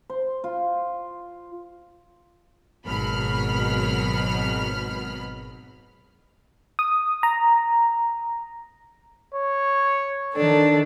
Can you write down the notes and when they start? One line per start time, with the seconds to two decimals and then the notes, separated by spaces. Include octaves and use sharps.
0.10 C5
0.44 F4
2.85 G#1 B2 F#3 B5 F6
6.79 D#6
7.23 A#5
9.34 C#5
10.33 D#3 D4 A4